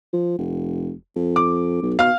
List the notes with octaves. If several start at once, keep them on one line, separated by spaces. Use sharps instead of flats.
F3
F1
F2
D6
B1
B2 F5 F6